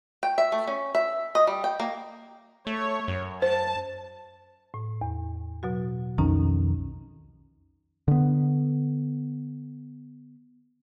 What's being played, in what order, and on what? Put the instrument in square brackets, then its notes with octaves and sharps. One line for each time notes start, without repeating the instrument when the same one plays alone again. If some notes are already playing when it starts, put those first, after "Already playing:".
[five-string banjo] G5
E5
A3
C#4
E5
D#5
G3
G5
A#3
[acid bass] A3 [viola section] C#5
[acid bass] F#2
[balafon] C5 [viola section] A5
[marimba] A2
E2
B2 F#3 F#4
[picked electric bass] B1 F2 D#3 [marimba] C#4 D#4 A#5
[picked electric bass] D3 B3